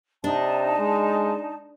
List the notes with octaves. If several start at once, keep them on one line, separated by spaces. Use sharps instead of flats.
C3 D4 D#4 A5
G#3